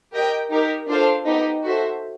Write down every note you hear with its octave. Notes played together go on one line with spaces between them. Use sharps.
G4 A#4 D#5 G5
D#4 G4 A#4
D4 F4 A4 C5 F5
B3 D#4 G4
F#4 A4 C5 E5